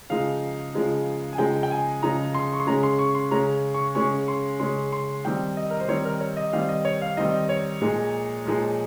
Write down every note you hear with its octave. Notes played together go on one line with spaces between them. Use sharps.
C#3 F3 G#3 D#4 F5
C#3 F3 G#3 D#4
G#5
C#3 F3 G#3 D#4 G5
G5
G#5
C#3 F3 G#3 D#4 A#5
C6
C#6
C6
C#3 G#3 C#4 A#5
C6
C#6
C6
C#3 G#3 C#4 A#5
C#6
C#3 G#3 C#4 C#6
C6
C#3 G#3 C#4 C6
C6
D#3 G3 C4 D#4 G5
D#5
A#4
C5
D#3 G3 C4 D#4 C#5
A#4
C#5
D#5
D#3 G3 C4 D#4 F5
D#5
C#5
F5
D#3 G3 C4 D#4 D#5
C#5
A#2 F3 G#3 D#4
A#2 F3 G#3 D#4